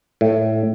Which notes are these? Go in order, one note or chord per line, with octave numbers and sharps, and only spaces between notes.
A2